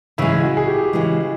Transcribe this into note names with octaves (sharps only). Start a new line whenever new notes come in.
C#3 E3 G#3 E4
F#4
G#4
G4
C#3 E3 G#3